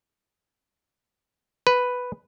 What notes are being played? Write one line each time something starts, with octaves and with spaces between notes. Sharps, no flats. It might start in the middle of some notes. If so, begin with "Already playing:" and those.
B4